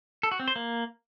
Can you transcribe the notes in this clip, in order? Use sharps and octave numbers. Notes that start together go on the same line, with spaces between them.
A4
F#4
C4
C5
A#3